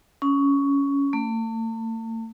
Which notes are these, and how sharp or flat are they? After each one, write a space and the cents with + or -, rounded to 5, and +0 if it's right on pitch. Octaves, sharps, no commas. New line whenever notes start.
C#4 +10
A3 +40